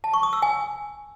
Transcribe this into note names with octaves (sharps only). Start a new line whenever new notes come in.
A5
C#6
D#6
E6
G#5